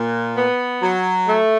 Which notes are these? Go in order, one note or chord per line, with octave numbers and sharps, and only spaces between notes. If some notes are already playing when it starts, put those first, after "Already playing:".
Already playing: A#2
B3
F#3
A3